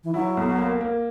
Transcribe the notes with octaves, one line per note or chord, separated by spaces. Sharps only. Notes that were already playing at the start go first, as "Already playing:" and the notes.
E3
F#3 E4
B1
A#3
A#3